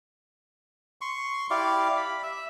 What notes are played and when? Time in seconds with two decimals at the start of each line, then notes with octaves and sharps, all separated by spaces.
1.01 C6 C#6
1.50 E4 G4 D5 F5
1.97 B5
2.23 E5